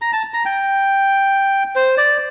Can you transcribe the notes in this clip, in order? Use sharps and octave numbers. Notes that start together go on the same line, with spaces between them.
A#5
A5
A#5
G5
C5
D5